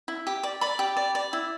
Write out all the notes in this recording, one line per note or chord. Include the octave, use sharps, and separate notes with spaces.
E4
G4
D5
D5 B5
G4
D5
D5
E4